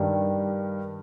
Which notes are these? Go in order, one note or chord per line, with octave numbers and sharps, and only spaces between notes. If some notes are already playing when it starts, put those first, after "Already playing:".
Already playing: G2 D#3 G3